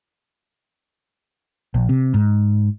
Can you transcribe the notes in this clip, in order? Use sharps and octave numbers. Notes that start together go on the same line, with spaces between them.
A#1
C3
G#2